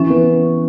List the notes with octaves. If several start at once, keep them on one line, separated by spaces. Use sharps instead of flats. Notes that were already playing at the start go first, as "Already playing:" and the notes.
Already playing: E3 C#4
B3